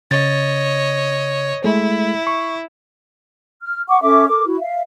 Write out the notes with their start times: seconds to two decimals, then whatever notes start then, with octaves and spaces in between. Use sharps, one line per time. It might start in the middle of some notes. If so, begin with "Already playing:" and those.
0.11 C#3 C#5 D#5 A6
1.64 G#3 A3 E4
2.27 C#6
3.63 F6
3.89 F#5 C#6 D6
4.02 C#4 A4 E5 D6
4.27 A4 A#4 D6
4.45 E4 F#4
4.60 E5 F5